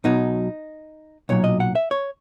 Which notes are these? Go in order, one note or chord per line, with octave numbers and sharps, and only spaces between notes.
B1 B2 F#3 D#4
B1 A#2 F#3 C#5
D#5
F#5
E5
C#5